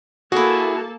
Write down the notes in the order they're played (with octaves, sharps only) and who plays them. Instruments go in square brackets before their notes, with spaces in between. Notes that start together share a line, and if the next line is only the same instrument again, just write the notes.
[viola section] A#3 A4 A5 [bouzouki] E4 G#4 [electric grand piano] F#4